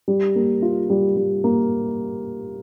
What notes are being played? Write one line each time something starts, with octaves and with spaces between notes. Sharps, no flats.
G3
A#3
F4
G3
G3
A#3